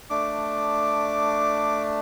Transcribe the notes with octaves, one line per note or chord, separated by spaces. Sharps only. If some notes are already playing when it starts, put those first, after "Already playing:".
A3 D4 D6